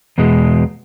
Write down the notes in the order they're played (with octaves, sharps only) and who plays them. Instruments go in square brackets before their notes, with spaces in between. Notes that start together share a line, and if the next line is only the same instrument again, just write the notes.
[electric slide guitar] E2 B2 G#3